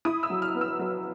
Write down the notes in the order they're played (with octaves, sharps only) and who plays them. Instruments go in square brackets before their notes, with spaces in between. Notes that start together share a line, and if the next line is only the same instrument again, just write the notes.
[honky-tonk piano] E4 D#6
E6
F#3
F6
B3
E6
F#3